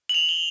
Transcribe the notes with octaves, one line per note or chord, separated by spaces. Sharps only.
F#7
F7
G7